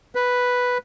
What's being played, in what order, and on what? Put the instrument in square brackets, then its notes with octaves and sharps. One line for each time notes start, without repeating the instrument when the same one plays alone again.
[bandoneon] B4